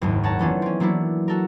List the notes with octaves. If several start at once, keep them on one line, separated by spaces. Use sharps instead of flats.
F#1 D#2 G#2 D#3
C#5 F#5 A5 A#5
E3 A3 B3 C#4 D4 F4
C4 C#4
F#3 A#3 B3 D4 E4
F#4 A4 A#4